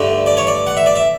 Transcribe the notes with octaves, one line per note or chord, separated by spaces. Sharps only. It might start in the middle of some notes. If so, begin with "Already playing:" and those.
Already playing: G2 D3 A3
D5
C#5
D5
F#5
E5
D5
E5